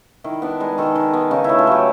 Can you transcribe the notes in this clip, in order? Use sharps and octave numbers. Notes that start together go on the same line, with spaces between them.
D#3 E4
B3 D4
G#3 D#4
D#3 A4
D#3
B3
C#3 D#4
A3 E4
F4
F#3 G4